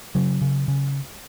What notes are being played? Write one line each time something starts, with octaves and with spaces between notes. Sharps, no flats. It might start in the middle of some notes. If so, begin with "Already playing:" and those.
C#3 F#3
C#3
C#3